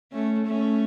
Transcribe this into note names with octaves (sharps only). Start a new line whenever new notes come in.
A3 C#4
A3 C#4